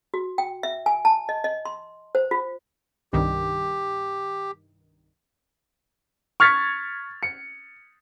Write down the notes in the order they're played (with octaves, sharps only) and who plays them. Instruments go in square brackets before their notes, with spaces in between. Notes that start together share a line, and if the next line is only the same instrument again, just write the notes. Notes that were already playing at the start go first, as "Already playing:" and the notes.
[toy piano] F#4
G5
E5
G#5
A5
D#5
D#5
C6
C5
F4
[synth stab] C2 G2 D#3 [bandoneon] G4
[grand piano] C#6 F6 G#6 A6 B6 C#7
C#7